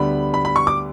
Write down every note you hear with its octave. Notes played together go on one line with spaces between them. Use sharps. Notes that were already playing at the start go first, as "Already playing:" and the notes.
Already playing: D2 D3 G3 B3 B5
B5
B5
C#6
D6